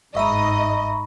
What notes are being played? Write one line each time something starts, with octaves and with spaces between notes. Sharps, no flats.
G1 G#2 D#5 E5 A#5 B5 C#6